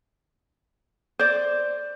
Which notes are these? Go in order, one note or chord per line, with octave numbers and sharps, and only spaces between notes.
C5 D5